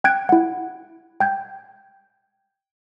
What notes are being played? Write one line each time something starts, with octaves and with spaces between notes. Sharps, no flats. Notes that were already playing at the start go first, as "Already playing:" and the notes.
G5 F#6 G#6 D7
E4 F#5
G5 G6 G#6